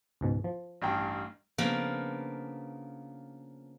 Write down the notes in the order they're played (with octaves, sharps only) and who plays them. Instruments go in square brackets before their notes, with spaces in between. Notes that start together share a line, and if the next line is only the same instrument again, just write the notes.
[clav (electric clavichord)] C#2 G#2 B2
F3
[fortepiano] A1 G2 G5
[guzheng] C#3 F3 A#3 B3 D4